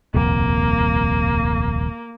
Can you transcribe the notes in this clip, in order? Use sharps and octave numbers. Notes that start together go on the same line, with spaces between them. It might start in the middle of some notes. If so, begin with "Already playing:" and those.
D#1 C2 F2 A#3